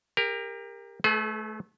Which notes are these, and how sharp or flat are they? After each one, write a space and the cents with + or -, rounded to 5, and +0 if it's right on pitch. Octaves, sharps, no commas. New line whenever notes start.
G4 +35 A#4 +0
A3 -20 G#4 +45 B4 +0